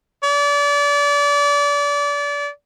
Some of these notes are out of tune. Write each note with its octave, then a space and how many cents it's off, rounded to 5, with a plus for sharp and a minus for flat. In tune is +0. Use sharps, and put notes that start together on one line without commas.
D5 -30